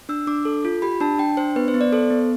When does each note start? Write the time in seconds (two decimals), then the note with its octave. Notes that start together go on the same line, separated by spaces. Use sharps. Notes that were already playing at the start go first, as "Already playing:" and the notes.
0.09 D4 E6
0.27 D4 D6
0.45 A4
0.65 F4
0.82 G4 B5
1.00 D4 A5
1.19 D4 G5
1.37 D4 C5
1.56 B3 B4
1.68 C5
1.74 B3
1.81 D5
1.92 A4 C5
2.10 B3